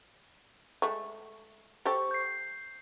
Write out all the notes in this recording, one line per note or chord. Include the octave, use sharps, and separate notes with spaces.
G#3 A3
G4 A4 C5 C#6
G6 C7